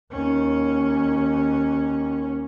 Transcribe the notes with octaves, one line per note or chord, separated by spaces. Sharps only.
D#2 C#4